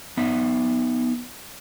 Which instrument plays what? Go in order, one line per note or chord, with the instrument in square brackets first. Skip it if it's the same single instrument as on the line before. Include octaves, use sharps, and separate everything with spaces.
[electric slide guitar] B3 D#4 E5